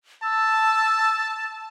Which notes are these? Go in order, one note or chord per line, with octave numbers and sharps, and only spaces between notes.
A5 E6